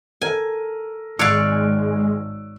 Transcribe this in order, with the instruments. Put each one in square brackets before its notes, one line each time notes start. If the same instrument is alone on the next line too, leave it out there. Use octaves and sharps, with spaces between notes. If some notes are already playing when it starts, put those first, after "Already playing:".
[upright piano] A4 A#4 [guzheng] G#5
[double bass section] G#1 [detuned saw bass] G#3 [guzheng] C#5 D5 F5 [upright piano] E6 F#6 D7